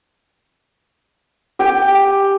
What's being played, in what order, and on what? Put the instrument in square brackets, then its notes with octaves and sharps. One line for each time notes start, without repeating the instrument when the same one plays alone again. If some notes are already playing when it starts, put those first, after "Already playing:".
[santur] G4 G5 G#5